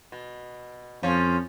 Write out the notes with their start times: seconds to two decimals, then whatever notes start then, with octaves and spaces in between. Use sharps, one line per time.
0.12 B2
1.03 F2 F3 C#4